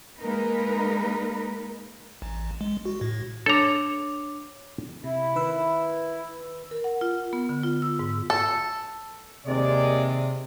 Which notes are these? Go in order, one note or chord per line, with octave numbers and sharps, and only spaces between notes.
G#3 A#3 D#4 A#4 B4
A1
G#3
F#4
A2
D4 A4 C#5 A#5 D6
C3 E4
D#3 B4 E6
A#4
F#5
F4
B3
D3
F4
E6
G#2
A4
D#2 C3 G#3 D5